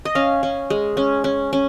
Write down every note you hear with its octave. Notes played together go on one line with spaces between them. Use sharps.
D#5
C#4 F5
C#4
G#3
C#4
C#4
C#4